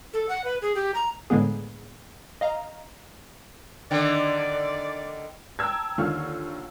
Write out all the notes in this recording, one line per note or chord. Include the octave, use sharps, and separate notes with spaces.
A4
F#5
B4
G#4
G4
A#5
A2 D3 G#3 A#3 B3 G#4
D#5 F5 A#5
D3 D#3 D5
G5 A5 A#5 E6 G#6
D#2 D3 D#3 F4 C#6 F6